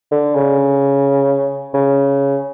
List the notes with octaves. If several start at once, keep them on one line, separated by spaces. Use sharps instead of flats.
D3
C#3
C#3